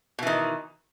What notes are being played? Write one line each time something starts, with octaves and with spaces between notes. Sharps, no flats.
B2 D#3 E3